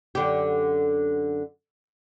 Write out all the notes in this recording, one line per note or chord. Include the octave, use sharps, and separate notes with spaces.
F#2 D3 G4